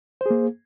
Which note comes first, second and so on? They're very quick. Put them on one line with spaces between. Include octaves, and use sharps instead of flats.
C5 G#4 A#3